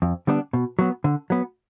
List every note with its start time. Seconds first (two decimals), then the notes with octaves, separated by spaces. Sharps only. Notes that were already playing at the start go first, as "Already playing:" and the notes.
0.02 F2
0.27 D3 G3 B3 D4
0.53 B2
0.79 F#3 B3
1.04 D3
1.30 F#3 B3